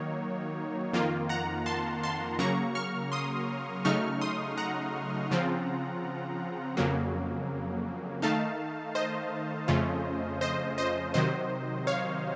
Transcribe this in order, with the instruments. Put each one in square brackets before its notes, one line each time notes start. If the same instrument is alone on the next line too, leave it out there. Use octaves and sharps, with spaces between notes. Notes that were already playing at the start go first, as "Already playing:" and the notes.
Already playing: [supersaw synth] D#3 F#3 A#3 D#4 C#5
F2 D#3 A#3 F4
F#5 A#5
A5 C6
A5 C6
C#3 F#3 A#3 A#5 C#6
C#6 F6
C6 D#6
C#3 F#3 A3 D#4 C#6 F6
C6 D#6
F#5 A#5
C#3 F3 C4 F4
F2 C#3 F#3 A#3
D#3 A3 D#4 F5 A5
C5 D#5
F2 C#3 A3 C#4 F4
C5 D#5
C5 D#5
C3 D#3 F#3 C5 D#5
C#5 F5